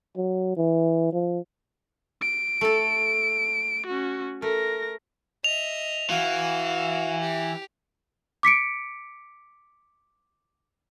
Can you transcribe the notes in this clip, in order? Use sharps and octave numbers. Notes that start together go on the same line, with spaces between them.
F#3
E3
F3
D7
A3 A4
C#4 F#4
A3 A#4 A#6
D#5 E5 F7
E3 F#4 F5
G4
D6 B6 C#7 D7